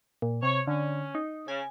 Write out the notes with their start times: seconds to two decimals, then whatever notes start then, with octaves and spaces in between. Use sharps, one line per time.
0.22 A#2
0.43 C3 C#5
0.67 D3 C#4
1.15 D#4
1.48 C#3 G#5